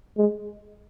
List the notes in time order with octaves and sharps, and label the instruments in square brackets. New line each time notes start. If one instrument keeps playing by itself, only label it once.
[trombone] G#3